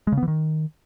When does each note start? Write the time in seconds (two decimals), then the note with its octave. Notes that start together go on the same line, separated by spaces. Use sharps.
0.07 G#3
0.12 C#3
0.17 B3
0.23 E3
0.28 D#3